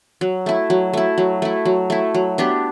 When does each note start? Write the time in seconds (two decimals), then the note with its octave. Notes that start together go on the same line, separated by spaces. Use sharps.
0.21 F#3
0.46 A3 E4
0.70 F#3
0.93 A3 E4
1.18 F#3
1.42 A3 E4
1.65 F#3
1.90 A3 E4
2.14 F#3
2.38 B3 D4 G4